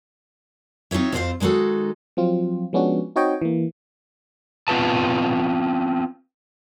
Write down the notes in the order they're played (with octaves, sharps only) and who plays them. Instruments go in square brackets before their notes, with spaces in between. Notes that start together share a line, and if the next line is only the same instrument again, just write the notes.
[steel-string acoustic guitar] C4 D#4 F4 C#5 E5
F2 C4 F4 A4 C5 F5
D#3 G#3 D#4 F#4 A4
[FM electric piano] F3 F#3 C4 F4
F3 G#3 B3 C#4 D4 F#4
C4 D#4 F#4 C#5 D#5 G5
E3 A#3
[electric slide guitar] B3 C4 F4 B4 A5